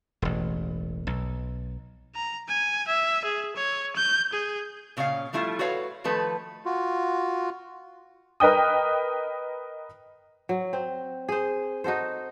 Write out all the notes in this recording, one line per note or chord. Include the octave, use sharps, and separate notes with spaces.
E1 A1
B1
A#5
G#5
E5
G#4
C#5
G6
G#4
A#2 C#3 C#4 F#4 F5
F3 G3 A3 E4 F4
F#4 A4 B4 C#5 F5
D#3 F3 A3 A4 B4
F4 F#4
A#4 B4 D#5 G5 D#6
F#3
C4
G#4 C5
D#4 F#4 A4 C5